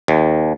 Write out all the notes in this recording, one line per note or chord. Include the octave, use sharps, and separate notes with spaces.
D#2